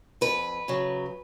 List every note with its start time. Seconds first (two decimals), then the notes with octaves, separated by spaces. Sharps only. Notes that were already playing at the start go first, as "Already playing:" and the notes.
0.21 F2 B4
0.68 C#3 F#3